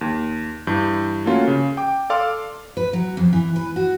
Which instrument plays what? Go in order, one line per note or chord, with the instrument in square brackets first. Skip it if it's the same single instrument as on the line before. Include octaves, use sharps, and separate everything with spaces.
[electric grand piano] D#2
G2 E3 G6
A3 A#3 C#4 F4 F#4
C#3
G5 D6
A4 D5 F5 C6 D6 F6
[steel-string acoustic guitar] B4
F#3
F2
E3
B4
F#4